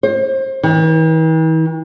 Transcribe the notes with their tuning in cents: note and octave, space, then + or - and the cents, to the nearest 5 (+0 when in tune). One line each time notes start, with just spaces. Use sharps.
C5 +30
E3 -45